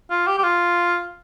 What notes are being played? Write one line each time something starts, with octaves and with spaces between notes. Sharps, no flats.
F4
G4
G4
F4